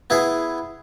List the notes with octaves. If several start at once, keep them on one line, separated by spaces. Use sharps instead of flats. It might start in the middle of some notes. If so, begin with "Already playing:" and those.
B3 E4 G#4